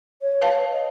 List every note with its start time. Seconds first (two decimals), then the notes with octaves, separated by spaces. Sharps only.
0.22 C#5
0.41 B4 F5 A5
0.72 D#5